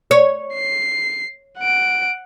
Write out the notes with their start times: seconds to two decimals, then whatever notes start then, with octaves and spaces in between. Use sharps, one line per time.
0.11 C#5
0.54 C7
1.59 F#5 D7